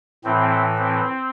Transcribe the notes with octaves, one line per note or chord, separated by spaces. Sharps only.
A2 E3 C4
C4